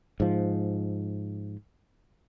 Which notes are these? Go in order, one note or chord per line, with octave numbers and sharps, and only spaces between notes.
G#2 F3